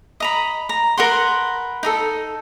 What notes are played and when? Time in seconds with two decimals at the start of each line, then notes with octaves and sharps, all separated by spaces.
0.20 D#5 A#5 B5
0.69 A#5
0.97 A#4 B4 F#5 C6
1.83 D#4 G4 A4